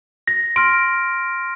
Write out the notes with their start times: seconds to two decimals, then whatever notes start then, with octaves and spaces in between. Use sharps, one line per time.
0.28 A#6
0.56 C6 F6 D7